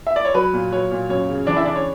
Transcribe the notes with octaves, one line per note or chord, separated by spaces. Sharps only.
E5
D5
C#5
F#3 B4
A#2
F#3 C#5
A#2
F#2 C#5
C#3
E3 D4 D5
E4 E5
C#3 D4 D5
C#5